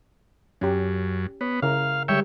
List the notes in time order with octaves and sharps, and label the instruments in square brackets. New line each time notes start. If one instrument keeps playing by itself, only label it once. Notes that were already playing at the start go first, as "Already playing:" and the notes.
[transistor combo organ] F#2 [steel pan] C#4 G4
[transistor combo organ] B3 [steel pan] C#5
[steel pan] C#3 E4 A#4 [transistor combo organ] F5
[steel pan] D3 G3 G#3 [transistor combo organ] C#5 E5 G5